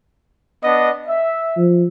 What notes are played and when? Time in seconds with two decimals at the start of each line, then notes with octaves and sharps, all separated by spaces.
0.64 B3 D4 D#5
1.08 E5
1.57 F3